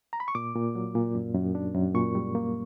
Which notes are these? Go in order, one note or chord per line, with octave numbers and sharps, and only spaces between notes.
A#5
B5
C#6
A#2 D6
A#2
F#3
A#2
F#2
F#2
D4
F#2
A#2 C#6
G3
A#3